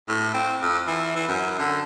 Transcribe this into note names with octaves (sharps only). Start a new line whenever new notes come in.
A2
C4
F2
E3
E3
F#2
D3